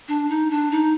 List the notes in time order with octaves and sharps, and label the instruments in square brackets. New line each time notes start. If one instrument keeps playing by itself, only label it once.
[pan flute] D4
D#4
D4
D#4